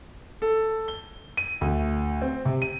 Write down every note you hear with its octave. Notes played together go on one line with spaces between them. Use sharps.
A4
G7
D#7
D2
C4
C3
D#7